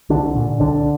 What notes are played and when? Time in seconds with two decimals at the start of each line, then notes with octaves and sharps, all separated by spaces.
0.09 C2 D3 D4
0.36 A#2
0.60 C2 D3 D4